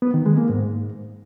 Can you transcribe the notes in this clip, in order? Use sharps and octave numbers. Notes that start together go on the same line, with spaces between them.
B3
D#3
G#3
A#3
G#2